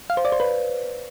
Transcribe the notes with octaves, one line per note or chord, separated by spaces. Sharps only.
F5
C5
D5
C5
B4